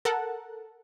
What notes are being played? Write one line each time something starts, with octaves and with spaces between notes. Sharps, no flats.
A4 A#4 F#5 A5